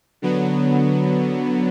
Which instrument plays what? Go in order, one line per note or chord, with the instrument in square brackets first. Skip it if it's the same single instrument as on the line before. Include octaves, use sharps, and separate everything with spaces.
[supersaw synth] D3 F#3 B3